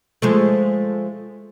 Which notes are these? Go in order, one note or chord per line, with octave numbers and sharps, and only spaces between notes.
F3 G#3 A3